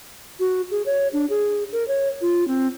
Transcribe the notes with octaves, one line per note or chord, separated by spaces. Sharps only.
F#4
G#4
C#5
D4
G#4
A#4
C#5
F4
C4